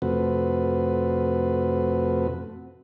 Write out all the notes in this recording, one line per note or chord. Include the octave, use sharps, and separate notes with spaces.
F2 C3 A3 C4 F#4 B4